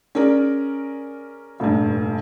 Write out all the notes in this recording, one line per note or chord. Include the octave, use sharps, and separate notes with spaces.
C#4 G#4 A#4 D5
F1 A#1 G2